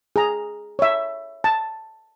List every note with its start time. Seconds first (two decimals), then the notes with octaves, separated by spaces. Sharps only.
0.16 G#4 A#5
0.79 C#5 E5
1.44 A5